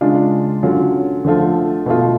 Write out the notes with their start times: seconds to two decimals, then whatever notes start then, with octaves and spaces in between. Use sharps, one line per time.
0.01 C#3 G#3 D4 F4
0.63 D3 F#3 C#4 F4
1.25 D3 F3 A3 F4
1.86 B2 A3 F4